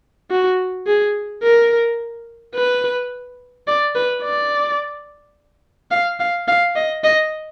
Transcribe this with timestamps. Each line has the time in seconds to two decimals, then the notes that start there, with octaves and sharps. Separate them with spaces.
0.31 F#4
0.87 G#4
1.43 A#4
2.55 B4
3.67 D5
3.95 B4
4.24 D5
5.91 F5
6.20 F5
6.48 F5
6.76 D#5
7.04 D#5